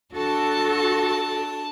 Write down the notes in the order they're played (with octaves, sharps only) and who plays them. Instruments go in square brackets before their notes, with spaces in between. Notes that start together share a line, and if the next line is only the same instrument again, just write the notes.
[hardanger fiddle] D4 A5 [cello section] F#4 A4